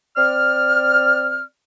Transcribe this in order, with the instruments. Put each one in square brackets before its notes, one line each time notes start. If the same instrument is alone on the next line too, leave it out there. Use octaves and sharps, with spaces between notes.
[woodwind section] C4 D5 F6